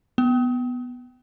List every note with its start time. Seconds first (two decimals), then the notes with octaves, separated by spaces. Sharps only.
0.18 B3